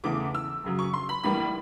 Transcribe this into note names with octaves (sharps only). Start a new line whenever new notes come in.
E2 C#3 E3 A3 D6
E6
F#2 C#3 F#3
C#6
C6
B5
A2 E3 G3 A#3 B5